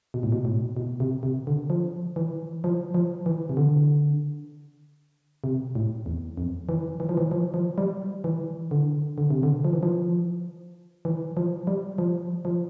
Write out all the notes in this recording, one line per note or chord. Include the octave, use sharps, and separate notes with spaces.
B2
A2
B2
A2
B2
C3
C3
D3
F3
E3
F3
F3
E3
C3
D3
C3
A2
E2
F2
E3
E3
F3
E3
F3
F3
G3
E3
D3
D3
C3
D3
F3
E3
F3
E3
F3
G3
F3
F3